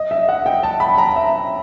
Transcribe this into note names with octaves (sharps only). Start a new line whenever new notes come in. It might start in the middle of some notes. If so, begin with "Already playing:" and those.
Already playing: D#5
E5
F#5
G5
A5
B5
A#5
E5